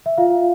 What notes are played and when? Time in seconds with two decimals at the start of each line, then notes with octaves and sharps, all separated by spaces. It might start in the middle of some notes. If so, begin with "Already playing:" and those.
0.06 E5
0.17 F4 F5